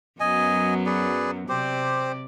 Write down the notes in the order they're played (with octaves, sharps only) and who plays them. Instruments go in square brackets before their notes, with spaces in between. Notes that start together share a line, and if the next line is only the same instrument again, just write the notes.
[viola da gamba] F#2 F#3 B3 [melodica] D#5 G#5
[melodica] G#4 B4 D5
[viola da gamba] C3 D5 [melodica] C4 G4 C5